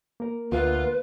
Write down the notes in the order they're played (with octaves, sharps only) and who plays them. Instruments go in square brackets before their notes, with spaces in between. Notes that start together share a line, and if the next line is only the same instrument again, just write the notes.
[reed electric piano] A#3 A#4
[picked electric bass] D2 [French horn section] F4 [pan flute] B4